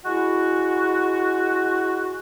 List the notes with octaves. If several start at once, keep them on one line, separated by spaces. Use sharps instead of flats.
G#3 E4 F#4